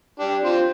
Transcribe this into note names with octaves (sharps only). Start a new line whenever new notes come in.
D4 G4
C4 F4